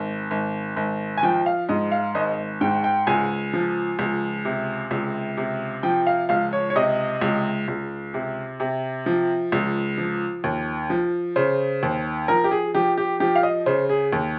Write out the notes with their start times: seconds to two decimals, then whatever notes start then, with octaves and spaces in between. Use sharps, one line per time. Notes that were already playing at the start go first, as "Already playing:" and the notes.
Already playing: G#1
0.31 G#1
0.76 G#1
1.17 G#5
1.23 F3 G5
1.46 F5
1.69 G#2 D#5
1.92 F5
2.15 G#1 D#5
2.61 G#2 G5
2.84 G5
3.07 C#2 G#5
3.53 F3
3.99 C#2
4.45 C3
4.91 C#2
5.37 C3
5.83 F3 G5
6.07 F5
6.29 C#2 F5
6.53 C#5
6.70 C#5
6.75 C3 D#5
7.21 C#2
7.68 C#2
8.14 C3
8.60 C3
9.06 F3
9.52 C#2
9.98 F3
10.44 D#2
10.90 F3
11.36 C#3 C5
11.83 D#2
12.28 F3 A#4
12.44 G4
12.51 G#4
12.75 F3 G4
12.98 G4
13.20 F3 G4
13.36 F5
13.43 D#5
13.66 C#3 C5
13.89 G#4
14.13 D#2